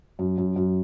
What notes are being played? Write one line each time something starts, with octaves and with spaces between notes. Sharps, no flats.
F#2
F#2
F#2